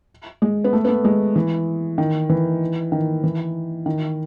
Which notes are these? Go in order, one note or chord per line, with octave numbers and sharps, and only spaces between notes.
G#3
B3
A3
B3
A3
G#3
E3
D#3
E3
D#3
E3
D#3